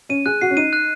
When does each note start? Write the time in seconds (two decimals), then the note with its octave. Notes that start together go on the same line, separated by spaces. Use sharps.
0.09 C#4 D#7
0.26 G#4 F#6
0.41 F#4 C7
0.50 C#4
0.57 D#4 D#7
0.73 F#6